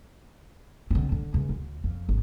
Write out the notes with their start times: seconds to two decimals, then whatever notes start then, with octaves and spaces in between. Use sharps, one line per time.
0.91 D3 C4
1.12 D3
1.34 C#2
1.49 D2
1.84 F2
2.09 G#1